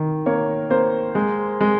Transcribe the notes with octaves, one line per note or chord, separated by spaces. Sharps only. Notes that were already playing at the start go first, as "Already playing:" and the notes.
Already playing: D#3
A#3 C#5
A#3 C5
G#3
G#3